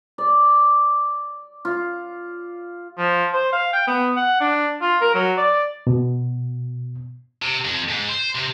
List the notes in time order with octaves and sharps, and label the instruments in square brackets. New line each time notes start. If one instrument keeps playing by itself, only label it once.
[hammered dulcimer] D5
F4
[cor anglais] F3
C5
F5
G5
B3
F#5
D4
F4
A#4
F#3
D5
[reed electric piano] B2
[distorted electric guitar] C3
F2
G#2
C5
C3